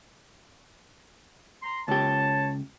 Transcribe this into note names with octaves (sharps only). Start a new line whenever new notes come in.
A#5 C6
C#2 G4 C#5 A5